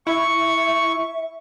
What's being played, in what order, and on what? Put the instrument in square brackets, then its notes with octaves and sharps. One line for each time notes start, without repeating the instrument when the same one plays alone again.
[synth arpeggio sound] E4 [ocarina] E5 [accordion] C#6